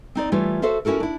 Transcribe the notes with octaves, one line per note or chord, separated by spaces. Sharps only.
C4 D#4 D5
E3 G3 A3 F4 C#5
F#4 A4 C5 E5 F5
C#4 E4 F#4 A4 A#4
D4 E4